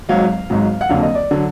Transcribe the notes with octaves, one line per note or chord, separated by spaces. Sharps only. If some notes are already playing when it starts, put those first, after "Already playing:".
G#1 G#2 F#3 F5
G#1 G#2 F#3
F#5
F#1 F2 D3 F#3 F5
D#5
D5
D3 F#3